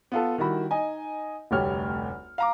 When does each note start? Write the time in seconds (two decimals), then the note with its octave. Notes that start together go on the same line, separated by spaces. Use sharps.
0.12 B3 F4 A4
0.38 D#3 G3 E4 F#4 B5
0.71 D#4 D#5 G#5
1.51 F1 D2 G3 G4 C#5 F6
2.38 F5 A#5 D6